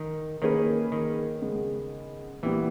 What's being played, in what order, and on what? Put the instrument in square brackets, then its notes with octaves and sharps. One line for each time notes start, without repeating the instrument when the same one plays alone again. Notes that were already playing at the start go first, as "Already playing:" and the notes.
Already playing: [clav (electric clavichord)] D#3
[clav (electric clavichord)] D#3 [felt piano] A#3 C#4 G#4 B4
[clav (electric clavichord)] D#3
[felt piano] C#3 G#3 B3
[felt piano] A#2 G3 B3 [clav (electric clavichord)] E3